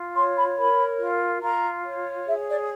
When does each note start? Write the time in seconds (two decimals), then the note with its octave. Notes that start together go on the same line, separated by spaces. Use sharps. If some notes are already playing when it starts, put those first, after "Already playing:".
Already playing: F4
0.15 C#5 C6
0.36 B5
0.57 A#4 B5
1.00 F4
1.42 F4 A#5
1.84 C#5
2.26 G#4 E5
2.48 D5